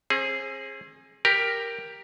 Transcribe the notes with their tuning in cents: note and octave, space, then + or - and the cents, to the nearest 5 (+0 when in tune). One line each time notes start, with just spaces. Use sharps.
C4 +40 G#4 +0
G4 +5 A#4 +0